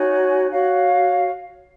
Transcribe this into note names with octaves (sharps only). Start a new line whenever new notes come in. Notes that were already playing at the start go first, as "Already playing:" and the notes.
Already playing: D#4 F#4 C#5 G#5
F#4 C#5 F5